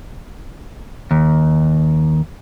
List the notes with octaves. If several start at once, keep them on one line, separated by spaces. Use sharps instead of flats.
D#2